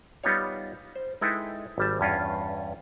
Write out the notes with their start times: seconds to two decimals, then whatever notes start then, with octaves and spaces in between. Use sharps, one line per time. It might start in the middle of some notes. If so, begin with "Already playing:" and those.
0.24 G3 B3 D#4 F4 C#5
0.95 C5
1.21 G#3 D#4 E4 A4 B4 G5
1.78 G#1 G3 A5
2.00 E2 G2 C#4 F4